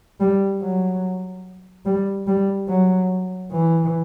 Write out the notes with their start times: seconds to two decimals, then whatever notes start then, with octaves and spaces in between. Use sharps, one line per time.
0.20 G3
0.62 F#3
1.85 G3
2.27 G3
2.68 F#3
3.52 E3